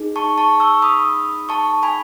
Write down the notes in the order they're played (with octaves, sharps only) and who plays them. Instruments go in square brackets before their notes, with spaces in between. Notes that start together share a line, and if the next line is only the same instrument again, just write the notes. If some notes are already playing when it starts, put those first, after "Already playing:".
Already playing: [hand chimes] D#4 G#4
A5 C#6
A5 C#6
C#6 E6
B5 D#6
A5 C#6
G#5 B5